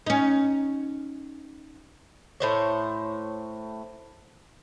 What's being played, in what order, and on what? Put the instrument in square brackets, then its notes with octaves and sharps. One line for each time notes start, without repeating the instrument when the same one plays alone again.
[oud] C#4 D#4
[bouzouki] A2 C5 C#5